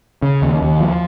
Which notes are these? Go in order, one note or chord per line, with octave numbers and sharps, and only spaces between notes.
C#3
D#2
D#2
F3